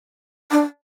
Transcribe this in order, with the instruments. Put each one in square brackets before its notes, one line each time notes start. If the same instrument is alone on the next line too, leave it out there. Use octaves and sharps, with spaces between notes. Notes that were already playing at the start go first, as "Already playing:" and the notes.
[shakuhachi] D4